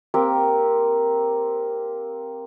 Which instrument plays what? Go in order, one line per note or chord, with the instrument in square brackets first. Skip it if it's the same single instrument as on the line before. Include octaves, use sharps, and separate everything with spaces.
[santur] A#3 C4 G4 A#4